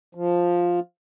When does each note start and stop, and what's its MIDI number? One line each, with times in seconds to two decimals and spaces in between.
0.15 0.80 53